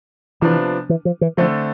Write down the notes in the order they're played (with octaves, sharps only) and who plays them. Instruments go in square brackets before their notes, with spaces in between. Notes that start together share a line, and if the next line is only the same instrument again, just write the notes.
[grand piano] C3 F3 B3 D4 F4 [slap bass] E3
[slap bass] E3
F3
E3
[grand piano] D3 A3 C4 [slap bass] F3